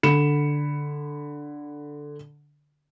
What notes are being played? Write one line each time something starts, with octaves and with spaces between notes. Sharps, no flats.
D3 B5 C#7 E7